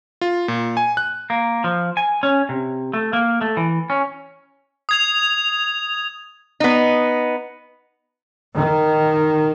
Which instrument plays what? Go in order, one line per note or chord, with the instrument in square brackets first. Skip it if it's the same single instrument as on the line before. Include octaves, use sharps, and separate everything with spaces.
[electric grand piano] F4
A#2
G#5
F#6
[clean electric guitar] A#3
F3
G#5
C#4
C3
A3
A#3
A3
E3
C#4
[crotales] D#6 G#6 F7
[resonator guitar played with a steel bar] B3 D#4
[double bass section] D#3